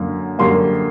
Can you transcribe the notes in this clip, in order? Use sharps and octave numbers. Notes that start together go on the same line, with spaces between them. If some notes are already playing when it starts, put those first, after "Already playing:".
Already playing: F#2 D3 A#3
F#2 D3 G3 A#3 C6